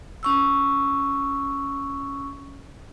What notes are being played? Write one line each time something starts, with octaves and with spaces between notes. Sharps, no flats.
C#4 C#6 E6